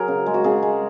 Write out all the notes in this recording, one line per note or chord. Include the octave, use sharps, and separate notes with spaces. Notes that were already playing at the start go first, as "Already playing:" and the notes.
Already playing: F#3 G#4 A#4
C#3
G#3
F#4
C#3 G#4
G#3